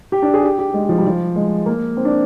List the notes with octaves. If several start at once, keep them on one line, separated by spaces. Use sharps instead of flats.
G4
D4
G#4
G4
G4
G#3
F3
G3
F3
G#3
A#3
C4
D4